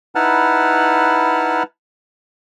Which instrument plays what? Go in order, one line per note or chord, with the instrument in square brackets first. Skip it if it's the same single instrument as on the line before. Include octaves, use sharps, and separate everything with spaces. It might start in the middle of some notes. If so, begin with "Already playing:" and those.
[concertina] D#4 E4 B4 F#5 A5 F6